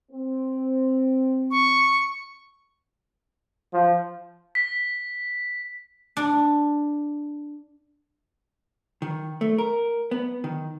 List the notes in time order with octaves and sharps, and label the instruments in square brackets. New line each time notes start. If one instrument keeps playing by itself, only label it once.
[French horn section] C4
[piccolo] C#6
[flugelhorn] F3
[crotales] B6
[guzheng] D4
[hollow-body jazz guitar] D#3
A3
A#4
B3
D#3